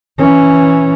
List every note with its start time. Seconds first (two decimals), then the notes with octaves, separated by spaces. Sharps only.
0.19 E3 C#4